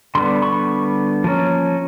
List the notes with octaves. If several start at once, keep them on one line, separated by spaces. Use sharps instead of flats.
D3 G3 B3 C6
B5 C#6
F3 A#3 C#4